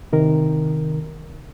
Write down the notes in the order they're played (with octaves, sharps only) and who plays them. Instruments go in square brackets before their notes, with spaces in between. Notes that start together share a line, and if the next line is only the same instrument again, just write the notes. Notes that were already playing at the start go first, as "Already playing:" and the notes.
[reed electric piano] C3 D#3 A#4